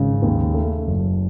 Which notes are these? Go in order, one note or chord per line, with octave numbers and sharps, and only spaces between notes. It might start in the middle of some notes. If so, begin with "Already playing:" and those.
Already playing: G#1 C#3
D#2
A3
F#1